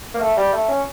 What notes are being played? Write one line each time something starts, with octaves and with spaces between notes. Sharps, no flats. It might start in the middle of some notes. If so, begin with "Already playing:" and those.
A#3
A3
G3
A3
C#4